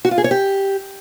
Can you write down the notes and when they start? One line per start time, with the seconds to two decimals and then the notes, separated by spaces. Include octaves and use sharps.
0.05 F#4
0.11 F4
0.18 G#4
0.24 C#5
0.31 G4